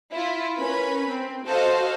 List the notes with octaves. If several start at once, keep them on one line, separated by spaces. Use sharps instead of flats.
E4 F4
C#4 A#4 B4 B5
C4
F#4 A4 C5 D#5 F5